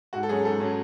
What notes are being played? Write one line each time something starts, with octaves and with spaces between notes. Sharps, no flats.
G#2 F#4
A4
F#3 C#4 G#4
G#2 A4
F#3 C#4